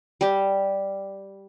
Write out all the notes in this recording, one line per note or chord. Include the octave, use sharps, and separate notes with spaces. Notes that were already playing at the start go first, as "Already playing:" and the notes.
G3 G4